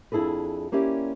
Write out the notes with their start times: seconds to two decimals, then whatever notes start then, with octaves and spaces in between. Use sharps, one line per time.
0.12 F2 D4 E4 G#4 A4 B4
0.72 A#3 C#4 E4 G4 D5